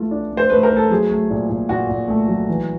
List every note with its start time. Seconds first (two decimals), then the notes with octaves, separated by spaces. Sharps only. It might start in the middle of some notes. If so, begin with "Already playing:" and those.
Already playing: A3 F4 A4
0.11 D4
0.31 A3
0.37 C5
0.50 A3 B4
0.63 A#4
0.71 A3
0.77 A4
0.90 F#3 G#4
1.10 A3
1.30 A#2
1.50 A#2
1.69 A#2 F#4
1.89 A#2
2.08 A3
2.28 F#3
2.48 E3